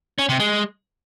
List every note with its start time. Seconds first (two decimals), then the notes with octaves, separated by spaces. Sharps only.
0.19 C#4
0.29 C3
0.40 G#3